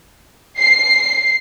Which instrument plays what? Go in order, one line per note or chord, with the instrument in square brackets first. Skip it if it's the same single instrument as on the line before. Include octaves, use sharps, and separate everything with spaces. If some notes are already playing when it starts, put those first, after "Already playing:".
[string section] C7